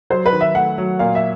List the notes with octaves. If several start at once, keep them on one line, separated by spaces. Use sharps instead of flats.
F#3 C5
B4
D#3
E5
A3 F#5
F#3
A#2 F5
E5